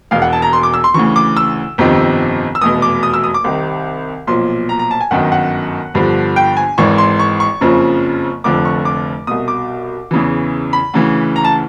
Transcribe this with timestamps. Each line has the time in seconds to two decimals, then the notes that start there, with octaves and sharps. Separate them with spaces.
0.11 E1 E2 B2 F5
0.22 F#5
0.33 A5
0.42 A#5
0.53 C6
0.63 D6
0.74 E6
0.84 C6
0.94 D2 C#3 E3 C#6
1.16 D6
1.37 E6
1.78 G1 F2 C3 D#3
2.55 E6
2.61 F1 E2 B2 D#6
2.82 D6
3.03 D#6
3.14 E6
3.24 D#6
3.34 D6
3.44 C2 C3 D#3
4.27 B1 A#2 F3 C6
4.69 A#5
4.79 A#5
4.91 A5
5.01 G#5
5.11 G1 F#2 D#3 F#5
5.32 F#5
5.94 G1 G2 D3 F3
6.36 G5
6.57 G#5
6.78 G#1 G#2 E3 C#6
6.98 C6
7.20 C#6
7.40 C#6
7.61 F#1 F2 C#3 F3
8.44 F1 F2 D3 F3 D6
8.65 C#6
8.85 D6
9.27 C2 B2 D#6
9.48 D6
10.11 E2 C#3 E3
10.73 B5
10.94 D2 C#3 E3
11.36 A#5
11.45 A5